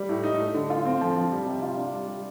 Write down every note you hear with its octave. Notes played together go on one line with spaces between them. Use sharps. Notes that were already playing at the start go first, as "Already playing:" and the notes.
Already playing: G3
A2
D#4
A3
D3
F4
C4
F3
F3
G3
C3
F4
D4
G3
G3